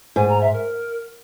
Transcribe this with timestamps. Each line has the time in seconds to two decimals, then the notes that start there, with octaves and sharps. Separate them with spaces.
0.16 G#2 G#5
0.29 A#5
0.41 E5
0.53 A#4